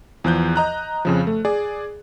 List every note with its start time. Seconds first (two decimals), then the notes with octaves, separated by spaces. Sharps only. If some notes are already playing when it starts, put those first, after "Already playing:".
0.24 E2 F3 F#6 G6
0.56 D#5 A#5 F#6
1.05 F2 C#3 F3
1.27 A3
1.45 G#4 D5